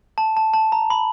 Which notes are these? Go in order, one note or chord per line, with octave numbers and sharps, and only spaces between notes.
A5
A5
A5
A#5
B5